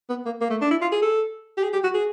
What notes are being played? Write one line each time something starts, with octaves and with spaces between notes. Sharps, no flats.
B3
A#3
A#3
A3
D4
E4
F4
G#4
A4
G4
G#4
G4
F#4
G#4